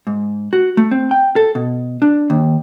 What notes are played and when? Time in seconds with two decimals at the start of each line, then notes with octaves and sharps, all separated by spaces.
0.07 G#2
0.53 F#4
0.77 A3
0.91 C4
1.11 G5
1.36 A4
1.55 B2
2.02 D4
2.30 D#2